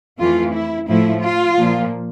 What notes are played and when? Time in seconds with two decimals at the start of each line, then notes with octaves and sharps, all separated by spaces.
0.19 F2 E3 A3 F4
0.53 E4
0.88 A2 F3 A3 E4
1.23 F4
1.58 A#2 F3 A#3